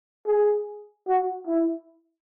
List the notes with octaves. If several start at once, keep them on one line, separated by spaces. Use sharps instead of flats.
G#4
F#4
E4